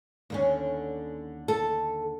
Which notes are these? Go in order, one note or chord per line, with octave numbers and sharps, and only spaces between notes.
D#2 D3 C#4
A4